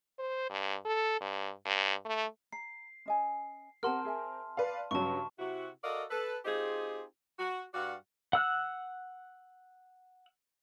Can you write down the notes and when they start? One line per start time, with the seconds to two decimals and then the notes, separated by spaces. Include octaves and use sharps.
0.19 C5
0.50 G2
0.85 A4
1.20 G2
1.65 G2
2.05 A3
2.52 A#5 C7
3.06 C#4 D#5 G#5
3.83 C4 G4 A#4 F#5 A5 C6 F6
4.05 G#4 E5 G#5
4.57 B4 D5 F5
4.91 G2 C#3 F#3 D#5 A5 C#6
5.39 C3 E4 F#4
5.84 F#4 A4 A#4 D5 D#5 F5
6.11 A4 B4
6.45 C4 D#4 F4 G4 G#4
7.39 F#4
7.74 G2 G3 F#4 D5 F5 F#5
8.33 F#5 E6 F#6